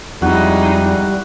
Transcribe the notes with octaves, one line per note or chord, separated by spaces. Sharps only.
F2 G3 G#3 D#4 E4 F#4